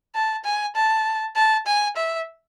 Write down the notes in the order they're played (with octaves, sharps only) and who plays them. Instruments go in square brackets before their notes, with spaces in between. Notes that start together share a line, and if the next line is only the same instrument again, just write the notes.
[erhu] A5
G#5
A5
A5
G#5
E5